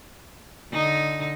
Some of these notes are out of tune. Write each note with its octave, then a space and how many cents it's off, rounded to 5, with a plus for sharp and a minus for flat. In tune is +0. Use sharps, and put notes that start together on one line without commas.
D3 +0 D#4 +0